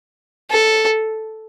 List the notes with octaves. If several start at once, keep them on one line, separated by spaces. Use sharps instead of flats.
A4